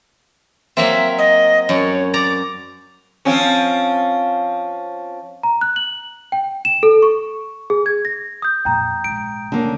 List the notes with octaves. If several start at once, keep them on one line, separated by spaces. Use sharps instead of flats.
F#3 A#3 C4 E5
D#5
F#2 C#5
D5 A#5 D6
F3 C4 C#4
A#5
F#6
F#7
G5
E7
A4
C#6
G#4
G#6
A#6
D#6 G6
F2 A#2 G5 A#5
A#1 G#2 D7
F1 G#2 D3 A#3 C#4